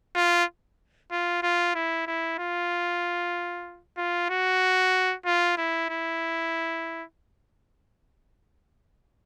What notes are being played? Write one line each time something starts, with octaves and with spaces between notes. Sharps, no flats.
F4
F4
F4
E4
E4
F4
F4
F#4
F4
E4
E4